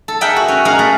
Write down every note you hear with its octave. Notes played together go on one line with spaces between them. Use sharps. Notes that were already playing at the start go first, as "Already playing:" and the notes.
A4
G#4 A#4 E5 F#5 G5
F#4
C#4
G#4 A#4 D#5 F5 F#5
A3